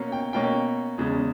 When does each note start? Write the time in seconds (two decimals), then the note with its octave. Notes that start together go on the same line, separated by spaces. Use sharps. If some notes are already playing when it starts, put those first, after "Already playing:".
Already playing: B2 A#3 C#4
0.12 G5
0.33 B2 A#3 C#4 G5
0.98 E2 C#3 G#3